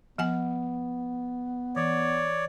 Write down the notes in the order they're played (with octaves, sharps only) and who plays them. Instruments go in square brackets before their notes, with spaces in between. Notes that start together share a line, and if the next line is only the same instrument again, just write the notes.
[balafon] F3 F#5 G#5 [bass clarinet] B3
[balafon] E3 [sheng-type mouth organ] C#5 D5